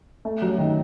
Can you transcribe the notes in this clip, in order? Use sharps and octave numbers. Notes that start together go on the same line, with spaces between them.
A3
F#3
D#3